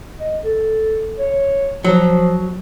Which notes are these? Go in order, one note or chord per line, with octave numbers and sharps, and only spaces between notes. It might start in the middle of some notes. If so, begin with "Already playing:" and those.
D#5
A4
C#5
F3 F#3